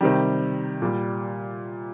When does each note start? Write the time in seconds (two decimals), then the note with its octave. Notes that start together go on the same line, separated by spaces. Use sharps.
0.01 C3 D#3 G3 G4
0.82 A#2 G3